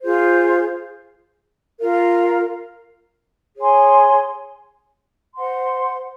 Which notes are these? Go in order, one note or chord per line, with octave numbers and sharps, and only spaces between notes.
F4 G#4 C5
F4 A#4 F5
G#4 C#5 G#5 C6
C5 F#5 C6